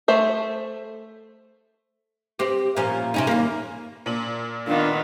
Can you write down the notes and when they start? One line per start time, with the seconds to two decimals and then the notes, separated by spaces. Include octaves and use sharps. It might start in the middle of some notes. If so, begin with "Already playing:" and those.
0.08 A3 C5 E5
2.39 C4 G4
2.76 A#2 F3 C#4
3.14 C3 C#4 D#4
3.27 D#2 A#3
4.06 A#2 D#7 F#7
4.67 D#3 B3 D4 F4